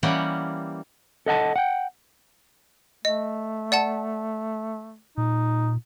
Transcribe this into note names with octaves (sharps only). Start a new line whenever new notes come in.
E3 G3 A#3 C#4 G4 F#5
A4 D#5 F#5 A5
F#5 G5
A3 D#5
D5 F#5 A5
A#2 D#4